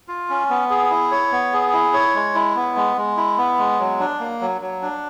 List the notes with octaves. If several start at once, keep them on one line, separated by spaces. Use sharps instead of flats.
F4
C#4
B3
G#4
E4
C#5
B3
G#4
E4
C#5
G#3
E4
B3
G#3
G#3
E4
B3
G#3
F#3
D4
A#3
F#3
F#3
D4